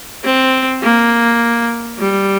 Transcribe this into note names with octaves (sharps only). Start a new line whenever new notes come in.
C4
A#3
G3